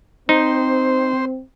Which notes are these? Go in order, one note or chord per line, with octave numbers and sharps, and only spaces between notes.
C4 D#4 C5